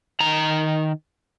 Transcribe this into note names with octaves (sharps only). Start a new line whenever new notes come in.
D#3 A#5